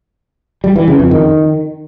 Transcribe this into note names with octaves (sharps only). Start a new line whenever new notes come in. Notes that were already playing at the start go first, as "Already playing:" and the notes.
G3
E3
C#3
F2
D#3